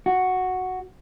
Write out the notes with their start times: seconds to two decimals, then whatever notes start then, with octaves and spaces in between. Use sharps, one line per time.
0.06 F#4